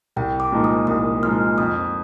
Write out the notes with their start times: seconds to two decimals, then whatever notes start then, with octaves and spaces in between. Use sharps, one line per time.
0.16 C2 G5
0.40 D6
0.52 A#2 F3 G#3 D#4
0.64 D#6
0.87 C2 D#6
1.23 A#2 F3 G#3 D#4 F6
1.58 F2 D#6